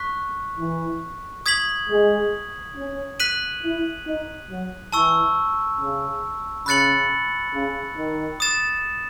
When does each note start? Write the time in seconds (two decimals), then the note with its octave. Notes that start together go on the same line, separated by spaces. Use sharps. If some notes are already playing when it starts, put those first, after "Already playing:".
Already playing: C#6 F#6 B6
0.59 E3
1.46 D#6 G#6 B6 F#7
1.89 G#3
2.76 C#4
3.20 F#6 B6 D#7 F#7
3.63 E4
4.07 D#4
4.50 F#3
4.92 E3 A5 C#6 E6
5.80 C#3
6.66 C#3 B5 F#6 A6 C#7 F#7
7.53 C#3
7.97 D#3
8.40 D#6 A6 E7